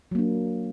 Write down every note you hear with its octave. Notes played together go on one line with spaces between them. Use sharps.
F#3 A#3 D4